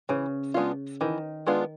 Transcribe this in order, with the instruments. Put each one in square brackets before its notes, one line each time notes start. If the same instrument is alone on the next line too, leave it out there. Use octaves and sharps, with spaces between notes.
[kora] C#3 [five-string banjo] E3
[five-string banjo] G#3 B3 D4 F4
[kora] D#3 [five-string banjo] E3
[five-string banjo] G#3 B3 D4 F4